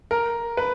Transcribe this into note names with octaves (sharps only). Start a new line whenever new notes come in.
A#4
B4